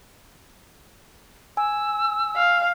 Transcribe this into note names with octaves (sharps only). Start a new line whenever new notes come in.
G#5 E6
F5